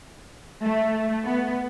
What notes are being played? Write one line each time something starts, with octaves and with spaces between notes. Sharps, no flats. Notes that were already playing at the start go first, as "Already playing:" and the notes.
A3
B3